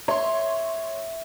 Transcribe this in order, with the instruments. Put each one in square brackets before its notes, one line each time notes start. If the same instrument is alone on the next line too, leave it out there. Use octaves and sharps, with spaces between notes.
[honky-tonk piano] C#5 C6 [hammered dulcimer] E5